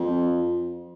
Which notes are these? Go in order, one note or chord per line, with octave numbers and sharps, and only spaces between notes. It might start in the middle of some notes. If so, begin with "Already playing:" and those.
Already playing: F2